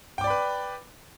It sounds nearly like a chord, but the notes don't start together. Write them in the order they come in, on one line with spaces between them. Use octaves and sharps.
G5 D6 D5 B5 B4